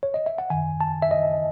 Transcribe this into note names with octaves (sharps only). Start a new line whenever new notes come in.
C#5
D#5
E5
F#5
F#2 D#3 G#5
A5
E5
D#5